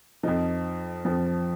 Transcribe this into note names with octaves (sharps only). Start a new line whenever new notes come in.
F2 F3 D#4
F2 F3